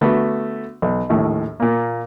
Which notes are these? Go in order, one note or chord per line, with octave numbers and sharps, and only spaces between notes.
D3 A3 B3 F#4
B1
A#1 D#2 A2
A#2 A#3